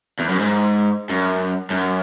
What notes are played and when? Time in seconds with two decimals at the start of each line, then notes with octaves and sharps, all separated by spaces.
0.19 E2
0.29 F#2
0.39 G#2
1.10 F#2
1.70 F#2